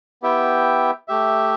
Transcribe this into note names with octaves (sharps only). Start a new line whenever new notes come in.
B3 E4 G4 E5 G5
A3 G4 E5